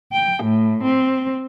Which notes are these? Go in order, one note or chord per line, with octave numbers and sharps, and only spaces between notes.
G5
A2
C4